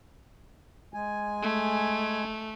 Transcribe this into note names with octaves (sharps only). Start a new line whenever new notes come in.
G#3 G#5
A3